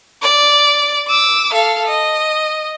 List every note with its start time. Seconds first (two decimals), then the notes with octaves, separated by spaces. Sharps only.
0.22 D5
1.08 D6 E6
1.53 A4 F5
1.87 D#5